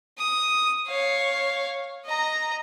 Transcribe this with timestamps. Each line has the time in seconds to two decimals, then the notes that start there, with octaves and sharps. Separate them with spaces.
0.18 D#6
0.87 C#5 F5
2.05 D#5 A#5